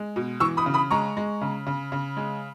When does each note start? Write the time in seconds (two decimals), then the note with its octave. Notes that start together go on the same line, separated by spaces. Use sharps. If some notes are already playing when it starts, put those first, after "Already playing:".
Already playing: G#3
0.16 B2
0.40 E3 C#6 E6
0.57 B5 D#6
0.66 C#3
0.74 B5 D#6
0.91 G#3 A#5 C#6
1.17 G#3
1.41 C#3
1.67 C#3
1.92 C#3
2.17 G#3